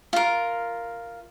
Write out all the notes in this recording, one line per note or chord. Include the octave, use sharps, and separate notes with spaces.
F4 A#4